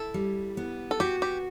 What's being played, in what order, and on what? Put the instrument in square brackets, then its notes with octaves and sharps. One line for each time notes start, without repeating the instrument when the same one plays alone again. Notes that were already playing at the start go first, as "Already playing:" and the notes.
Already playing: [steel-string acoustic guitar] E4 [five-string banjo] A4
[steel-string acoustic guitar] G3
B3
[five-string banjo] A4
[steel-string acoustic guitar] F#4 [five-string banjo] G4
[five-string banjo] G4